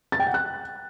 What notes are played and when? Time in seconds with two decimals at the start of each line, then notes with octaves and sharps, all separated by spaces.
0.12 A6
0.20 G5
0.27 F#5
0.34 F#6